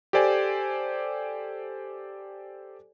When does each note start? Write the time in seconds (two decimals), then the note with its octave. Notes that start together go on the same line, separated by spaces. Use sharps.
0.13 G4 A4 C5 D5 G#5